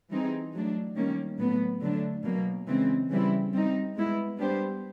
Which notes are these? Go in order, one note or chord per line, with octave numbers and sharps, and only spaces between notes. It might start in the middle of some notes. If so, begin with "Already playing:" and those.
E3 G3 C4 D#4 G#4
F#3 A3 D4
D#3 G3 A#3 C#4
A2 F#3 B3
D3 F#3 A3 D4
B2 F#3 A#3
C#3 E3 G#3 C4
C#3 E3 G3 C4 E4
G3 C4 D#4
G#3 B3 E4
G3 B3 D4 G4 C5